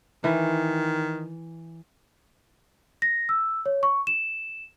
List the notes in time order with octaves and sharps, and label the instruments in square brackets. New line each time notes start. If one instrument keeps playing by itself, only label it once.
[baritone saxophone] D#3 [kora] E3
[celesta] A#6
E6
C#5
C#6
E7